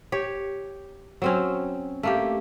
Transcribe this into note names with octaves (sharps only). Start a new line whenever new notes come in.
G4 C#5
F#3 C4 C#4
A3 A#3 G4